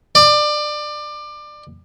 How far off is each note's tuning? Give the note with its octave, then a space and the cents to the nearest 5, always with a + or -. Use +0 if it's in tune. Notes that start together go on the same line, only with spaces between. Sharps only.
D5 +25